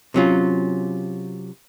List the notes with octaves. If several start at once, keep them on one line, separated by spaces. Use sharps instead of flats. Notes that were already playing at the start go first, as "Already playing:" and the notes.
C3 F#3 C#4 F4